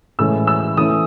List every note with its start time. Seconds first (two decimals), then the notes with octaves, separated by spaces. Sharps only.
0.19 A2 E3 G#3 C#4 E6
0.47 E6
0.77 E3 A3 C#4 D#6